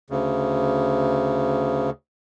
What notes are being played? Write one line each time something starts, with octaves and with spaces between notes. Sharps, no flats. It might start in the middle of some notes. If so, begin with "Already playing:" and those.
D2 C#3